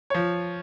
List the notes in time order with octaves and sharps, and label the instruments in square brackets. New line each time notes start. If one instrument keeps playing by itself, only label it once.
[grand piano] F3 C#5